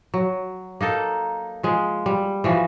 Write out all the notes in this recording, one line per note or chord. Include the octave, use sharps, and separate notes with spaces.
F#3
A#3 D#4 A4
F3 G#3
G3
E3 F3 F#4